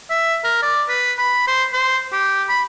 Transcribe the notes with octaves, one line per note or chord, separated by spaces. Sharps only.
E5
A#4
D5
B4
B5
C5
C5
G4
B5